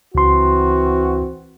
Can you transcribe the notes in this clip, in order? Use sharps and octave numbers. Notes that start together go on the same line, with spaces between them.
C#2 E3 C4 F#4 C6